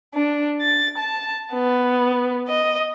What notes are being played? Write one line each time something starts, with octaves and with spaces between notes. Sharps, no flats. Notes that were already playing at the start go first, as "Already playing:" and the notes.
D4
A6
A5
B3
D#5